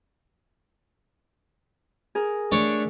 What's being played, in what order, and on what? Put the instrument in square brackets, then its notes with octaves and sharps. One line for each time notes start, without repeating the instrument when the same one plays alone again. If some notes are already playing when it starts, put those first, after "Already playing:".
[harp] G#4 A#4
[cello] A3 [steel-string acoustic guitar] D4 [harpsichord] C#5 D5